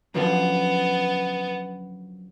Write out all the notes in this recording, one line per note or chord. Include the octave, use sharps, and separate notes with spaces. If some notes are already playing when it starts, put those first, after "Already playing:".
F#2 D3 F3 B3